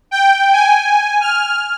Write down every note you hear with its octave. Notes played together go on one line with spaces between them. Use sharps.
G5
G#5
F6